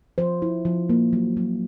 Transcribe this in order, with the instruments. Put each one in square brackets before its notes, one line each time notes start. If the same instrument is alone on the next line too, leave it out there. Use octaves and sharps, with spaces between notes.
[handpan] F3 C5
E4
F3
A#3
F#3
F#3